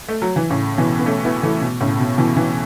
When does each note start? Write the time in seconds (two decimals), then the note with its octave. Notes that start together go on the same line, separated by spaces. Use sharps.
0.09 A3
0.22 F#3
0.36 E3
0.50 A2 C#3
0.78 B2 E3
0.99 B3
1.06 A3 C#4
1.25 B3 E4
1.43 E3 A3
1.61 B2
1.80 A2 C#3
1.99 B2
2.18 B2 E3
2.36 B2 E3